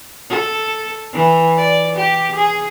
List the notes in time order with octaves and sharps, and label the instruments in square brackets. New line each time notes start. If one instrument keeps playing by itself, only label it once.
[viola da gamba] A4
E3
D5
G4
G#4